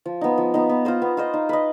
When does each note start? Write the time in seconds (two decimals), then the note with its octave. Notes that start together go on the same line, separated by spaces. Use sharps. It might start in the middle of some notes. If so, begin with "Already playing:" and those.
0.05 F3
0.21 B3 D#4
0.38 F3
0.54 B3 D#4
0.69 B3
0.85 F4 C5 D#5
1.02 B3
1.17 F4 C5 D#5
1.34 D#4
1.49 B4 D#5